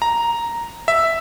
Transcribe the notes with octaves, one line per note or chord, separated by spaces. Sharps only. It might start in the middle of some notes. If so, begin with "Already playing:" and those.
A#5
E5